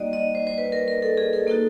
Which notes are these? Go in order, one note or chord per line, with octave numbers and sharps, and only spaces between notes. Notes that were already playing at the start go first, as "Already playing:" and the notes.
Already playing: G3 A#3 D#4 F#4 D5 D#5
D#5
C5
C5
B4
A#4
A#4
A4
G#4
A4
A#3 D#4 F#4 A4